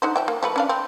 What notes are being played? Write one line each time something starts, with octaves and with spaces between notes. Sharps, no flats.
D3 D#4 C5
F3 E5 G5
A#3
F3 A3 B4
C#4 D4 F5
C4